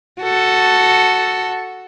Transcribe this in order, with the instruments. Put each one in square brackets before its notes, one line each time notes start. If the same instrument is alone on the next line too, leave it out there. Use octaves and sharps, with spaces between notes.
[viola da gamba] F#4 A4